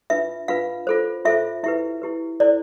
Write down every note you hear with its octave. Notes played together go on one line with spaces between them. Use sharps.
D4 F4 B4 E5
D4 F4 B4 F5
F4 A4 C5
F4 A4 C5 E5
E4 G4 B4 E5
E4 G4 B4
E4 A4 C5 D5